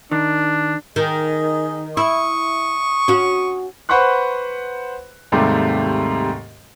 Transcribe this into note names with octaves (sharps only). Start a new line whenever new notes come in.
D#3 D4
D#3 G#4 D#5
E4 C#6 D#6
C#4 F#4
B4 C5 F#5 B5 C#6 F#6
D#2 G#2 C3 G3 A3